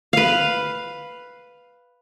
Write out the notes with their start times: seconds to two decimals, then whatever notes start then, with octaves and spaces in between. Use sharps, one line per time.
0.13 B4 F5